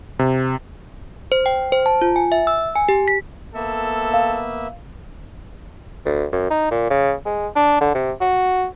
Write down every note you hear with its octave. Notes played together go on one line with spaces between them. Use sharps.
C3
C5
G5
C5
A5
F4
G#5
E5
E6
G#5
G4
B6
A#3 B3 A4 E5
F5
D2
F#2
D#4
A#2
C#3
G#3
D4
D3
C3
F#4